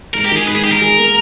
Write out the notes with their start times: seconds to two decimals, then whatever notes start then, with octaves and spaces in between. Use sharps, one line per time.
0.14 G#2 A#4
0.25 G4
0.31 D#3
0.37 G#4
0.48 G#2 B4
0.56 G#4
0.64 G#2 G4
0.72 A#4
0.81 G#4
0.98 A#3